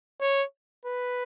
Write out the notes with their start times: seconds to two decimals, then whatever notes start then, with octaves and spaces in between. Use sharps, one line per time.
0.21 C#5
0.85 B4